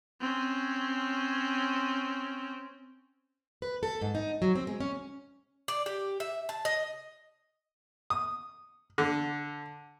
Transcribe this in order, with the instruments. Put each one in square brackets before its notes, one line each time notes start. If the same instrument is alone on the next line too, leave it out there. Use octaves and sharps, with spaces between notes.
[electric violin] C4 C#4
[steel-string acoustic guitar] B4
A4
G#2
D#4
F#3
C4
G#3
C#4
[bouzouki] D5
G4
E5
A5
D#5
[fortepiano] D#6
D3